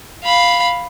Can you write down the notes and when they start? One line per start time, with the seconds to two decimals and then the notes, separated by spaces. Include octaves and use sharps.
0.24 F5 B5